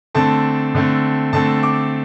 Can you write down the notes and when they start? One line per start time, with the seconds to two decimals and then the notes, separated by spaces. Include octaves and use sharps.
0.15 D3 A3 C4 A5
0.75 D3 A3 C4
1.33 D3 A3 C4 A5
1.63 D6